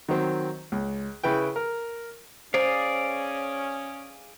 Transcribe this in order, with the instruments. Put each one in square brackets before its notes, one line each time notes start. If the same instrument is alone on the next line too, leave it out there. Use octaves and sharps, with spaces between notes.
[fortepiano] D#3 F#3 C4
C#2
C#3 E4 B4 G5
A#4
[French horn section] C#4 [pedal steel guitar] G#4 D5 F5 [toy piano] C5